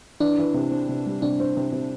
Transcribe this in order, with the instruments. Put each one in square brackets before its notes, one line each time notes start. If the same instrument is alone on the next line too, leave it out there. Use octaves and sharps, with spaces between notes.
[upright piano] E3 [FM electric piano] D4
[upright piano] E3
C3
C4
C3
G3
[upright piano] C3 [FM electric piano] D4
[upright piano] C4
C3
C3